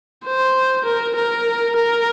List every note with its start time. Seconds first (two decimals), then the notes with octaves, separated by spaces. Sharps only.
0.26 C5
0.85 A#4
1.16 A#4
1.77 A#4